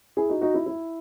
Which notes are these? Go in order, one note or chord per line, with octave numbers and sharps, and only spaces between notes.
E4 G#4
D#4 F#4
D#4 F#4
E4
E4